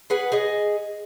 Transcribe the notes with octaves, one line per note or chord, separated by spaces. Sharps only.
G#4 B4 F#5
G#4 D#5